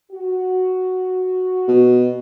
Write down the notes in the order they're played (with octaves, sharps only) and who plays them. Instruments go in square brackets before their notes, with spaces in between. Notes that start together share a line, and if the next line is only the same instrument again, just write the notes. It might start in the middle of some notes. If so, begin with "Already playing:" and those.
[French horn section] F#4
[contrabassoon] B2